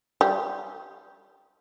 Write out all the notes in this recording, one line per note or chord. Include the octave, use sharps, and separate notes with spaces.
G3